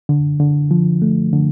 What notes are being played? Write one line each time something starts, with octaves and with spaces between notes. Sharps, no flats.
D3
D3
F3
A3
D3